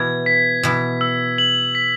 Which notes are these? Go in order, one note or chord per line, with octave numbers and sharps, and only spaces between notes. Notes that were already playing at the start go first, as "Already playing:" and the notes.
Already playing: B2 E3 G#6
B6
B2 E3 B6
E6
F#7
B6